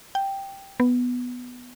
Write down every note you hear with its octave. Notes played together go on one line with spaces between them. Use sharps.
G5
B3